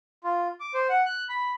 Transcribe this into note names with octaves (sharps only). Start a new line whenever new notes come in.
F4
D6
C5
F#5
F#6
B5